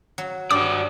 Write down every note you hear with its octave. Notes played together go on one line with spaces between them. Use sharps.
F#3
G2 F#4 D5 D6